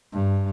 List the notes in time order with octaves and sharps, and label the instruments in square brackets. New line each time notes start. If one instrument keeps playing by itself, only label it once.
[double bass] G2